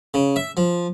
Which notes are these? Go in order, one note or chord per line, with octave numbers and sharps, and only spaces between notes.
C#3
E5
F3